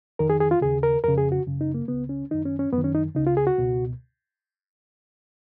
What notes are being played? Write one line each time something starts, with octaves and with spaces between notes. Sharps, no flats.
F2 D#3 A#4
G#4
G#4
F4
D#2 C#3 G#4
A#4
F2 C#3 A#4
G#4
F#4
F#2 C#3
D#4
A#3
C#2 C#3 B3
C#4
F#2 D#3 D#4
C#4
C#4
F#2 D#3 B3
C#4
D#4
C#2 C#3 D#4
F4
G#4
F#4
C#2 B2